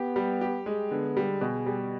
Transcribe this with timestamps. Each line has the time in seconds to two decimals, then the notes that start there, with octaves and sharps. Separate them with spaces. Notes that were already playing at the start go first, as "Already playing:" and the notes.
Already playing: B3 G4
0.16 G3
0.41 G4
0.66 G#3
0.91 D3 B3
1.17 G3
1.41 B2 G#4
1.66 G3